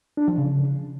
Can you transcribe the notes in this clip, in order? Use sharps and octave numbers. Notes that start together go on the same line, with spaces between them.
D4
F3
C#3